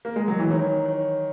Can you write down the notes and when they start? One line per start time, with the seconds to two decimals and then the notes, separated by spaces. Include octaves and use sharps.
0.05 A#3
0.16 G#3
0.28 F#3
0.39 E3
0.51 D#3 C#5
0.86 C#5